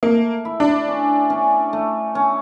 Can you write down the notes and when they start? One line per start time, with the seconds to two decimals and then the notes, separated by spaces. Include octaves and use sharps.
0.03 A3 A#3
0.45 E4
0.60 D4
0.88 C#4
1.30 C#4
1.73 A3
2.15 C#4